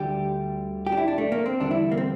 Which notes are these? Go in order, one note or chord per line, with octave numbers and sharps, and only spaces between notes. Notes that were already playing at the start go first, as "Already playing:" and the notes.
Already playing: D2 D3 G3 G4
G4
D4
E4
D4
A3
A#3
C4
E2 D3 G3 D4
E4
A#3
C4